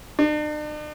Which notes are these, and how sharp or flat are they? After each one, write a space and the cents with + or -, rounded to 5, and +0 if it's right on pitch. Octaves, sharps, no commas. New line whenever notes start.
D4 +45